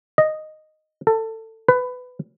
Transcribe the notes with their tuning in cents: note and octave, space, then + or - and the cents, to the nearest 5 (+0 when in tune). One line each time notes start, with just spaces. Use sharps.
D#5 -5
A4 +20
B4 +15